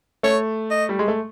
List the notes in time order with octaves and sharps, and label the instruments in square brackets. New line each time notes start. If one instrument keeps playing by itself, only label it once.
[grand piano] A3 [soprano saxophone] C#5
[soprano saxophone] D#5
[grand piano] G3
G#3
A3